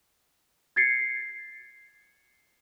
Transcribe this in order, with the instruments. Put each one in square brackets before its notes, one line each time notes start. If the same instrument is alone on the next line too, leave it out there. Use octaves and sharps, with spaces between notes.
[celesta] G#6 A6 C7 C#7